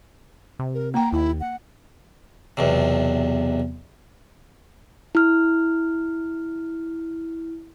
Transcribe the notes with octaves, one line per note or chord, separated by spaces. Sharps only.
C3
A#4
A#3 G5 A#5
D#2 E4
F#5
B1 E2 C3
E4 F6